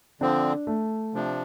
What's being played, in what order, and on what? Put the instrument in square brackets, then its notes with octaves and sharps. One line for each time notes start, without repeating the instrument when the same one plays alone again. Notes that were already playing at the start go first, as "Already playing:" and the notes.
[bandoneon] D3 F3 C4 [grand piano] D4
[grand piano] A3
[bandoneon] C3 F3 D4